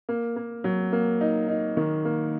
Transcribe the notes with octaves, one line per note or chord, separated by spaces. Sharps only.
A#3
A#3
F#3
A#3
D#4
D#4
D#3
A#3